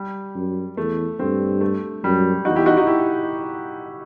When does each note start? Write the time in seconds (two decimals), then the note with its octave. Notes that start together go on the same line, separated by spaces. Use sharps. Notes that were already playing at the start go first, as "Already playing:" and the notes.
Already playing: G3
0.35 F#2
0.77 E2 A3
1.19 G2 A3 C4
1.61 A3
2.04 F#2 G3
2.45 E2 D#4 F#4
2.55 E4 G4
2.66 D#4 F#4
2.77 D#4 F#4
2.87 E4 G4